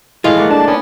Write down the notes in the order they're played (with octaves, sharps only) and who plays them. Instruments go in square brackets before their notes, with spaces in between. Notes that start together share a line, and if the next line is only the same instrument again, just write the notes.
[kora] A2 E3 F3 [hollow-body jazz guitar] G#3 [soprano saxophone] F4
[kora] A3 A#3 F#5
[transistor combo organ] D4 [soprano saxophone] A5
[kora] B3 [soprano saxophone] C#4